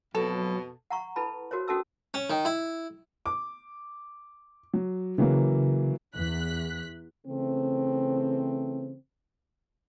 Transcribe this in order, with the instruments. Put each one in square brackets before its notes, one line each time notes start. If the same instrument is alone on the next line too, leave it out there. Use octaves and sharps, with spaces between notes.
[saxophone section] F2 B2 [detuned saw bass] F#3 [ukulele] A4
[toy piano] F#5 A#5 C#6
E4 A4 B4 A5 B5
F#4 A#4 C5 C#5
C#4 F#4 A4 A5 D#6 E6
[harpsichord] C#4
D#3
E4
[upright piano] D6
F#3
[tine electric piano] C#3 [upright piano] E3 F#3 A#3
[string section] E2 F#6 B6
[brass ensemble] C#3 E3 A3 C4